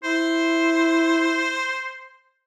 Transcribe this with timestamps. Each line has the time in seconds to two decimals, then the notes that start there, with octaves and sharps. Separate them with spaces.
0.04 E4 C5